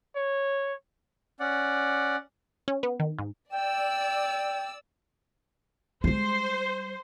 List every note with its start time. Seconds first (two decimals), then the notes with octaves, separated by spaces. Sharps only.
0.16 C#5
1.40 C#4 D5 F#5
2.68 C#4
2.83 B3
3.00 D#3
3.19 G#2
3.52 D5 G5 E6
6.04 G3 G#3 C5